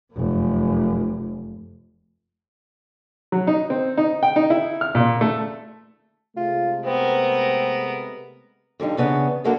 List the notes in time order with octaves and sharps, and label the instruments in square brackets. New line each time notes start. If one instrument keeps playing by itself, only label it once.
[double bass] F1 F#2
[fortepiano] F#3
D#4
C4
D#4
G5
D#4
E4
F6
A#2
A3
[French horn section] C3 G#3 A3 [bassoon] F4
[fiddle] B3 A#4 [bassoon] C4
[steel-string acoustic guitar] F2 D3 G3 D#4
E2 C#3 B3 D4
F#2 D3 A#3 F#4 A4 A#4